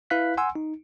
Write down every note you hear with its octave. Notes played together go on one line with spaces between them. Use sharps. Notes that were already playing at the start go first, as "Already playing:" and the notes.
E4 B4 F5 F#6 B6
F#5 G#5 C6 E6
D#4